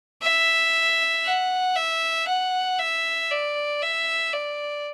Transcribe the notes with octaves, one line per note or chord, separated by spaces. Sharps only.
E5
F#5
E5
F#5
E5
D5
E5
D5